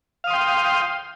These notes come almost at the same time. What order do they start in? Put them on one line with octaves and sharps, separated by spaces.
F5 D#6 C6 G5